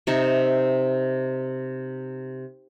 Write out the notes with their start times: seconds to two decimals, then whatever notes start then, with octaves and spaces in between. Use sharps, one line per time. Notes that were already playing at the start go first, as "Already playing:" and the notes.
0.07 C3 D#4 E5